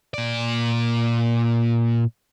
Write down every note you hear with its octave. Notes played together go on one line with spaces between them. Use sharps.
A#2 D5